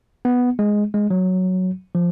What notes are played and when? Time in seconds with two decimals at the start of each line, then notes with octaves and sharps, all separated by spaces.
0.25 B3
0.59 G#3
0.94 G#3
1.10 F#3
1.95 F3